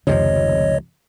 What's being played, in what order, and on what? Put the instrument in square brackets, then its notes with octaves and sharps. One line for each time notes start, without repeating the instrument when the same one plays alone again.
[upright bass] F1 D#3 [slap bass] C#2 C3 F3 [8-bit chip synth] C#5 D#5